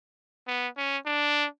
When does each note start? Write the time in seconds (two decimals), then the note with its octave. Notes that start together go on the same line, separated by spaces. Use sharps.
0.47 B3
0.77 C#4
1.06 D4